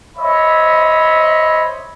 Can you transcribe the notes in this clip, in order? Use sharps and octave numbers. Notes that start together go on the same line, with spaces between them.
C5 C#5 D#5 E5 B5